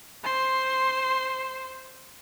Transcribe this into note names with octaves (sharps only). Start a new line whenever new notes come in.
C5 C6